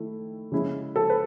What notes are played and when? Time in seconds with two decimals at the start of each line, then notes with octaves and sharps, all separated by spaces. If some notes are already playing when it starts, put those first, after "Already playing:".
Already playing: D#3 A3 E4
0.52 C#3 G#3 C#4 E4
0.96 A4
1.10 B4